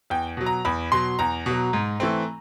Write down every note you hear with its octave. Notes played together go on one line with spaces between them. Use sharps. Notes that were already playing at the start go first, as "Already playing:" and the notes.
E2 G5
B2 F#3
A#5
E2 B5
B2 F#3 C6
E2 A#5
B2 F#3
G#2
E3 A3 C4